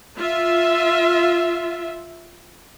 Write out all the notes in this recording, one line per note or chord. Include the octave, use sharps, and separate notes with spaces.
F4 E5